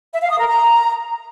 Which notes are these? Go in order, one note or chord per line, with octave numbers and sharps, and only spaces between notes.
E5
F5
D#6
A#4
A#5